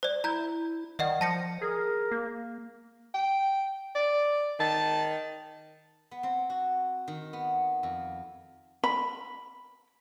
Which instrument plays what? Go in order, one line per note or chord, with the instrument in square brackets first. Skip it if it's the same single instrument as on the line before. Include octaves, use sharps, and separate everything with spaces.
[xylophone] C5 D5
[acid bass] E4 [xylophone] A#5 G6
[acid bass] D#3 [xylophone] D5 D#5 F#5
[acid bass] F3 [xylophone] A5 A#6 C#7
[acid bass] G#4 [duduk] A#4
[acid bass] A#3
[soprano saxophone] G5
D5
[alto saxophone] D#3 [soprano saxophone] A5
[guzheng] B3
C4
F#4
D#3
B3
F2
[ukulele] B5